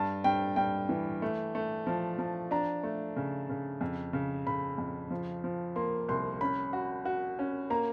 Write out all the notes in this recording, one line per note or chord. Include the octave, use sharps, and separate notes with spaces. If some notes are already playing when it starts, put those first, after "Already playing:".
Already playing: G2 A5
G2 G5
G2 G5
E3
A3
A3
F3 A5
F3 A5
D4 A#5
A3
C#3
C#3
F2
C#3
C#3 B5
F2
F3
F3
A#3 C6
C2 C6
C#4 B5
F#4
F#4
C#4
A#3 A#5